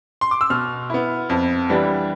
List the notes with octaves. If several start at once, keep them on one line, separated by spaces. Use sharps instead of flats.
C6
D6
E6
B2 F6
B3 E4
F2
E3 G3 B3 D4